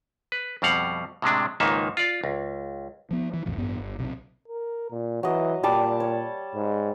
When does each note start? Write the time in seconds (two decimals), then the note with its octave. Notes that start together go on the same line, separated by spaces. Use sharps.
0.32 B4
0.62 F2 B2 G3 F5 F#5
1.22 A2 C3 G#3 D4
1.60 C#2 G#2 D#3 A#3 D#4 E5
1.97 F4 D5
2.24 C#2
3.11 F3 B3
3.34 E3
3.46 B1 F2 A2 E3
3.58 A1 G2 B3
3.80 G1
3.99 B1 C3
4.48 A#4
4.91 A#2
5.23 E3 F#3 D#5
5.63 A#2 G3 A5 D6
6.00 C#5
6.55 G#2